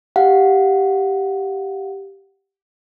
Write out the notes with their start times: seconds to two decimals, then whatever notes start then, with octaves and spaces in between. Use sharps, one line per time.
0.16 G4 F5 F#5